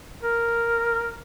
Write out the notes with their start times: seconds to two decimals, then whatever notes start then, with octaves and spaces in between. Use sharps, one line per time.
0.23 A#4